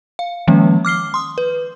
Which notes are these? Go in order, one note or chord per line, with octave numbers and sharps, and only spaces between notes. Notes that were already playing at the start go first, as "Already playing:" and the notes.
F5
D#3 F3 G#3 A#3 C#4
D6 F6 C7 G7
C6 D#6
B4